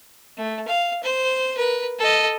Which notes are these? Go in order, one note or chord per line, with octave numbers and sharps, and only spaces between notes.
A3
F5
C5
A#4 B4
A4 D#5